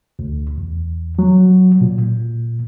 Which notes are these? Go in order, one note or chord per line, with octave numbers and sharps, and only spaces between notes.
D2
E2
F#3
A#2
A#2